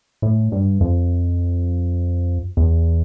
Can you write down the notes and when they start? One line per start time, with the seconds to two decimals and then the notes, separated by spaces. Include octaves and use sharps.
0.22 A2
0.52 G2
0.81 F2
2.57 E2